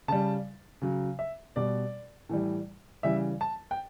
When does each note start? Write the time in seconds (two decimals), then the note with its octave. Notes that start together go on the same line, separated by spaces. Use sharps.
0.08 C#3 G3 A5
0.82 C#3 F#3
1.19 E5
1.56 B2 G3 D5
2.29 A2 E3 G3
3.03 C#3 E3 G3 E5
3.41 A5
3.71 G5